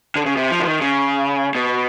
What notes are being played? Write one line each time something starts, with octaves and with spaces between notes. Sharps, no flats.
D3
C#3
C3
F3
D3
D#3
C#3
B2